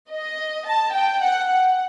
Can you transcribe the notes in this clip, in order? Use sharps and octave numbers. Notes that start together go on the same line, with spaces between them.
D#5
A5
G5
F#5
F#5